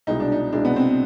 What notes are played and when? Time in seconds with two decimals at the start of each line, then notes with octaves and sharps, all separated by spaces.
0.07 C2 B2 G#3 D#4
0.20 D4
0.32 D#4
0.53 C2 B2 G#3 D4
0.65 B3
0.76 C4